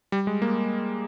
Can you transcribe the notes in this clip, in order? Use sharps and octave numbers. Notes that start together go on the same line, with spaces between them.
G3
G#3
A#3